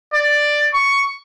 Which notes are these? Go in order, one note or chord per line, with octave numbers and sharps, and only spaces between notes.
D5
C#6